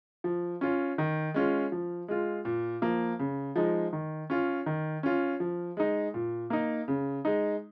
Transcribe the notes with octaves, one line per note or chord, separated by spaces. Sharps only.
F3
C#4 F4
D#3
G#3 C#4 F4
F3
G#3 F4
A#2
F3 A#3
C#3
F3 G#3 D#4
D#3
C#4 F4
D#3
C#4 F4
F3
G#3 D#4
A#2
A#3 D#4
C#3
G#3 D#4